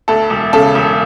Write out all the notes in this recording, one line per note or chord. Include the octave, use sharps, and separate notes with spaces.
D2 A4
E1
C#3 A4
E1